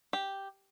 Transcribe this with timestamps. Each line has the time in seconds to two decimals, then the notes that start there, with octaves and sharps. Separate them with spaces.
0.13 G4